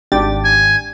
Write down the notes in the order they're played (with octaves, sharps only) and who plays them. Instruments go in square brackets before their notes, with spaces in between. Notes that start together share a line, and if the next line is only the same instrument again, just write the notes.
[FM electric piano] G#1 A6 [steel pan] D4 G4 G5
[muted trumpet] G#5